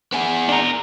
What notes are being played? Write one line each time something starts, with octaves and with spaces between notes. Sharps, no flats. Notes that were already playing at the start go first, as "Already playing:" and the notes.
B3 G#4
D4 A#4